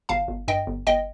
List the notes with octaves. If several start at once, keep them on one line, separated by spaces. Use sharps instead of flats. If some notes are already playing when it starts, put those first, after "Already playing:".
G1 F5 A5
G1
G2 D#5 G5
G1
G1 D#5 G5